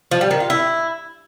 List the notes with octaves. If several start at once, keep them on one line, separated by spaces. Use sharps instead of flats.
F3
G3
D#3
F4
E4